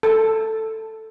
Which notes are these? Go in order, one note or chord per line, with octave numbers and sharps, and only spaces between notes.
A4